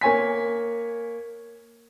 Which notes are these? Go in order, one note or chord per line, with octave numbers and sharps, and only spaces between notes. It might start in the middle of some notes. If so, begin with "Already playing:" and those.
A#3 C#5 G#5 B6